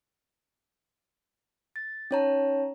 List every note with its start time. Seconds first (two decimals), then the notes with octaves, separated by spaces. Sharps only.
1.76 A6
2.11 C#4 D#4 C#5 A5 A#5